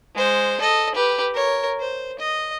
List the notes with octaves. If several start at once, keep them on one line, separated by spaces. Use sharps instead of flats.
G#3 C5
A4 D#5
G4 B4
A#4 C#5
C5
D#5